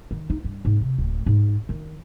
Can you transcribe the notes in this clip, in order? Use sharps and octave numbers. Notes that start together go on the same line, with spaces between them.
D#3
D#4
G2
G#2
C3
D1
G#2
D#3